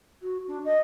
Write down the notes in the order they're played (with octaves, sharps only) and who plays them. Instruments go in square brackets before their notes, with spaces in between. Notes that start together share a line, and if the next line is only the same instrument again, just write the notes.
[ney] F#4
D4
D#5